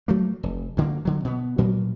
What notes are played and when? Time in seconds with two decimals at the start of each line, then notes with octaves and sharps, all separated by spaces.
0.08 F#3 A3 A#3
0.43 F1
0.77 D2 D3 G#3 A#3
1.05 D3 F#3
1.25 B2 B3
1.57 D2 A#2 F#3 A#3